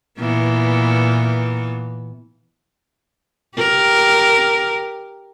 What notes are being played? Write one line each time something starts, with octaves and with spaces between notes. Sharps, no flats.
A#2 E3 B3
G4 A#4